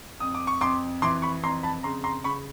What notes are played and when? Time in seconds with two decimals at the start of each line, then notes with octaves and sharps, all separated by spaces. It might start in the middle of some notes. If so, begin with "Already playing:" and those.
0.20 F2 D#6
0.35 D6
0.47 C#6
0.61 F2 C6 D6
1.02 E3 C6 D6
1.22 B5 C#6
1.43 F2 A#5 C6
1.63 A5 B5
1.83 C#3 A#5 C6
2.04 A#5 C6
2.24 C#3 B5 C#6